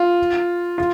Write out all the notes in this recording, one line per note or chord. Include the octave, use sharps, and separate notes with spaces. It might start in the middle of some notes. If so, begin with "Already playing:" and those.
Already playing: F4
F4